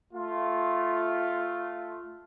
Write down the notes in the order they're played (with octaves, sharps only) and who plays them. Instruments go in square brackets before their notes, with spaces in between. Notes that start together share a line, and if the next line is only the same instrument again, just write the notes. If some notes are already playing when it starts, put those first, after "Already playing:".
[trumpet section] A3 F4